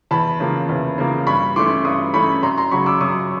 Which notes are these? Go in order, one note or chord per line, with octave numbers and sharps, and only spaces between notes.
E2 A5 B5
C#3 F3 A#3
E2
C#3 F3 A#3
G2 B5 C#6
E3 A3 C#4 C6 D6
G2 C#6 D#6
E3 A3 C#4 B5 C#6
F#2 A#5 C6
A#5 C6
C#3 F#3 B5 C#6
D6 E6
F#2 C#6 D#6